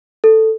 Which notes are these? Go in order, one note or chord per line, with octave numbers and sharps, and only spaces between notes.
A4